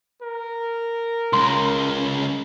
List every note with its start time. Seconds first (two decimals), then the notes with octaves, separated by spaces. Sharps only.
0.22 A#4
1.33 C#2 C#3 C6